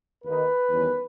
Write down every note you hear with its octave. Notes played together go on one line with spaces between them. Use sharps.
D#2 D#3 A#3 D#4 B4
E2 D#3 G3 C#4